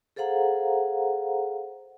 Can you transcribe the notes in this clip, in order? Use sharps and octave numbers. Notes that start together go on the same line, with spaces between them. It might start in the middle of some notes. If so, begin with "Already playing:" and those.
G#4 A4 C5 F5 F#5 A#5